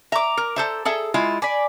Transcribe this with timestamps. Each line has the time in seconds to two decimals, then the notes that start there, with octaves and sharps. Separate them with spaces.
0.12 E5 A#5 D6
0.37 A#4
0.56 A4 C5 E5
0.85 G#4 A4 E5
1.14 G#3 E4 F4
1.42 D5 G#5 B5